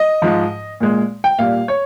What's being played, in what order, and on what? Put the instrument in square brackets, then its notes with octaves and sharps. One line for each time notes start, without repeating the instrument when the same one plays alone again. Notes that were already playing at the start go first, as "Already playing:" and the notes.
Already playing: [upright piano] D#5
G#2 F3 G#3
A#2 G#3
G5
A#2 G3 F5
C#5